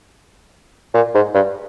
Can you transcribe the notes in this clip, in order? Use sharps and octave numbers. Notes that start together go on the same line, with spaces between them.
A#2
G#2
G2